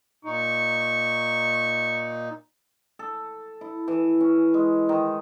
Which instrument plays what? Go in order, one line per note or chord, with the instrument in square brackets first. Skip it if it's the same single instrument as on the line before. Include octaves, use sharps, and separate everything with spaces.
[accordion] A#2 D#4 [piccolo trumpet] C#6
[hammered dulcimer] A4
E4
E3
C#4
G#3
D#3